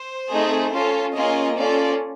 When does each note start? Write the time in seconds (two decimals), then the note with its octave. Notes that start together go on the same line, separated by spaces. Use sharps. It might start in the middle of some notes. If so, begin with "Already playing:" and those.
Already playing: C5
0.31 A3 C4 D#4 G#4
0.73 C#4 F4 A4
1.15 A#3 C#4 F4 G#4 D#5
1.57 C#4 F4 A4 D5